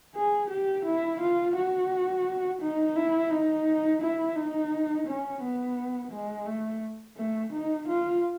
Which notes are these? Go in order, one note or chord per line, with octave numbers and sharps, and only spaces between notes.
G#4
G4
E4
F4
F#4
D#4
E4
D#4
E4
D#4
C#4
B3
G#3
A3
A3
D#4
F4